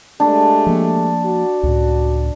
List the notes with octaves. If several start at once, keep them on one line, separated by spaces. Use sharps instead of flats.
G#3 A3 D4 G4
F3 A#3
F#4
C#2 A2